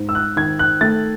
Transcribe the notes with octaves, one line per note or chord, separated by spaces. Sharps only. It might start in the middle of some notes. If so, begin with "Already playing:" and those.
Already playing: G#2
E6
F#6
D#3 G#6
F#6
A3 A6